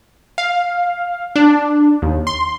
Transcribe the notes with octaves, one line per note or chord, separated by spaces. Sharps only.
F5
D4
D#2
C6